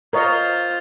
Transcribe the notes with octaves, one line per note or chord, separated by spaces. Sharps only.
F4 A#4 C5 C#5 D#5